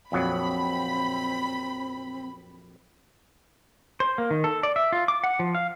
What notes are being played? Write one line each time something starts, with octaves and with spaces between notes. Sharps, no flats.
A#1 F2 F#3 C4 B5
C5
A#3
D#3
A4
D5
E5
F4
D6
F#5
F3
F5